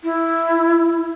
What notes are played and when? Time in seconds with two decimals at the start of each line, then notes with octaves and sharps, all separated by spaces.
0.04 E4